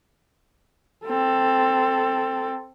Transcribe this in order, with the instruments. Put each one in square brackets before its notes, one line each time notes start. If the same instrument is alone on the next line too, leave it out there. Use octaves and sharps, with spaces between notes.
[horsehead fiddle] C4 A4